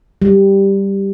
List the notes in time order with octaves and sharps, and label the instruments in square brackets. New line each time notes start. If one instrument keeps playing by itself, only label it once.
[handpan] G3